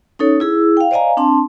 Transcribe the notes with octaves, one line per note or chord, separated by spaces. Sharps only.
C#4 D#4 A4 C#5
E4 G#4 E6
F5 G5
C5 D5 D#5 F5 G#5 A#5
C4 D4 A5 C6